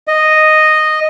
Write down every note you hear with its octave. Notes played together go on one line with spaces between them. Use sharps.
D#5